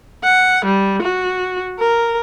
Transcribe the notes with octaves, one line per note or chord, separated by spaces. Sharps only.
F#5
G3
F#4
A#4